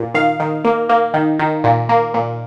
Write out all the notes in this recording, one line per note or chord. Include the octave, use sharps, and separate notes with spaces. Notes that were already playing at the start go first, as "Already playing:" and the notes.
Already playing: A#2
D#3 F5
D#3
A#3
A#3
D#3
D#3
A#2
A#3
A#2